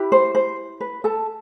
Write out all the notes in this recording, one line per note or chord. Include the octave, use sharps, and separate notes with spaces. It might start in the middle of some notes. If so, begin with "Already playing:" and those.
Already playing: E4 G4 B4
C5
C5
B4
A4 A5